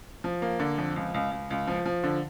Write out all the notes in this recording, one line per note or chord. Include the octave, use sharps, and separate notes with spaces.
F3
A#3
D3
F2
C#2
C#2
C#2
C#2
F3
F3
D3